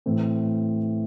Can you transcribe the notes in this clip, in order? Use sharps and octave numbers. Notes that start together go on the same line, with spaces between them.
A2 E3 A3 C4